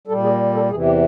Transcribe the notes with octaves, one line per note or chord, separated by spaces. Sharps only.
A#2 G3 A4
G#4
A4
E2 C3 E3 G#4
G4